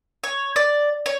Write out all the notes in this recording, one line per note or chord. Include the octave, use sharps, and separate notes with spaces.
C#5
D5
C#5